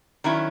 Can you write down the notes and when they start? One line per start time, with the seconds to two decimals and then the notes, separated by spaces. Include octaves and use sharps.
0.24 D#3 F#3 C#4 E4